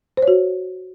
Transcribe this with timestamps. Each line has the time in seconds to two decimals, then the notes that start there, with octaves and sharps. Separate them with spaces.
0.17 C5
0.22 C#5
0.28 F#4